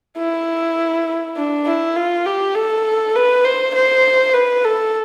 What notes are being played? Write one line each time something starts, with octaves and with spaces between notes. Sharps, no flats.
E4
D4
E4
F4
G4
A4
B4
C5
C5
B4
A4